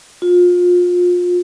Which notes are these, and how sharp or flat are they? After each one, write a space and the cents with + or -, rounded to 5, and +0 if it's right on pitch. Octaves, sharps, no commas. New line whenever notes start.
F4 +30